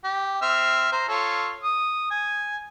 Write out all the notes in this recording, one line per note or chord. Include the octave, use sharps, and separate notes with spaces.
G4
C4 E5 F6
C5 A#5
F4 A4 C#5
D#6
G#5